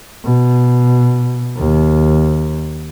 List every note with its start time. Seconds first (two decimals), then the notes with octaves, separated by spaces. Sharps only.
0.25 B2
1.57 D#2